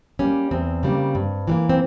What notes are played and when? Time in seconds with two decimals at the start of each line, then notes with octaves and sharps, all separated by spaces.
0.19 G3 A#3 C#4
0.51 E2 C4
0.83 C#3 G3 A#3
1.15 G2
1.48 E3 G3 A#3
1.69 C4